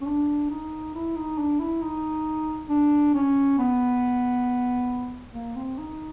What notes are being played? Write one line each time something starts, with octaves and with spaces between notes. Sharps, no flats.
C#4
D4
D#4
E4
D#4
D4
E4
D#4
D4
C#4
B3
A#3
C4
D#4